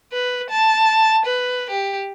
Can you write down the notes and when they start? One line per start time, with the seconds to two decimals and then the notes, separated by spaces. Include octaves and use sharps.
0.12 B4
0.50 A5
1.26 B4
1.70 G4